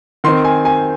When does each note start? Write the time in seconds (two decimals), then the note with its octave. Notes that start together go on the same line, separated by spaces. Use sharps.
0.24 D#3 C4 C6
0.45 G#5
0.65 G#5